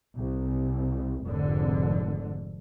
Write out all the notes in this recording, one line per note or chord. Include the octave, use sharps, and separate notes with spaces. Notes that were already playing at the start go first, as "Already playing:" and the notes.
C2
F1 G#2 D3